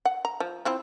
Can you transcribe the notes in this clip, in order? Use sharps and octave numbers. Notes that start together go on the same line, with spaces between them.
F#5
A#5
F3
F3 C4 E4